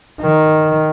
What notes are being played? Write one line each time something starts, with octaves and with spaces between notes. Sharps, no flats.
D#3